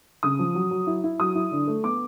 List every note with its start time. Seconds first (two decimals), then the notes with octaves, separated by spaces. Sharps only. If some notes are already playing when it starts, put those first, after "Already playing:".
0.23 C#3 D#6
0.39 F3
0.55 F#3
0.71 F#3
0.87 E4
1.04 E4
1.19 F#3 D#6
1.35 E4
1.51 D3
1.67 A3
1.84 B3 D6